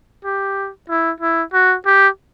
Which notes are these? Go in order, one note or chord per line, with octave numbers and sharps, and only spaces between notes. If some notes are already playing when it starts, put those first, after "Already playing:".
G4
E4
E4
F#4
G4